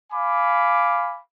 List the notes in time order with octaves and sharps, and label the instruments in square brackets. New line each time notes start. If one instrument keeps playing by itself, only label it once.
[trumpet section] F5 G#5 B5 D6